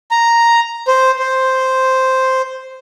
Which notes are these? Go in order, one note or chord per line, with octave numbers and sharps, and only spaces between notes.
A#5
C5
C5